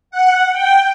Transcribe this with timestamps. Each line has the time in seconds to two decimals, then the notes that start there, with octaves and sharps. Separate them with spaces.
0.11 F#5
0.52 G5